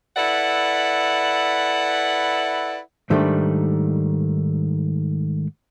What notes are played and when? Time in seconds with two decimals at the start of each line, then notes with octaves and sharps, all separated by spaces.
0.16 E4 A4 B4 D5 E5 F#5
3.10 G#2 D#3 G3 A3 D4